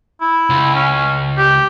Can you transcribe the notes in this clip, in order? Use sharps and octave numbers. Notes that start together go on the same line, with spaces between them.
E4
C#2
C#4
G4